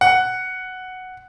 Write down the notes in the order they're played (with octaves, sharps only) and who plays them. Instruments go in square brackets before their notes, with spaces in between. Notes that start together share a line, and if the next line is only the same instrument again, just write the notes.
[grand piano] F#5